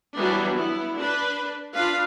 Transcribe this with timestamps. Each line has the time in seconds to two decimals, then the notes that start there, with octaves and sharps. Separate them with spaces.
0.16 E3 F#3 G3 B3 D4
0.56 B3 E4
0.98 D4 B4
1.73 D4 F4 B4 F5